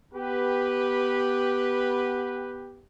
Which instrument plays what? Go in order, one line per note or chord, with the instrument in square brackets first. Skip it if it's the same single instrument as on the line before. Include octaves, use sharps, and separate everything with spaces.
[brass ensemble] B3 G4 B4